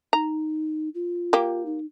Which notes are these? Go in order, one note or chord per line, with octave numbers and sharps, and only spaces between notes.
D#4 A#5
F4
A#3 G4
D#4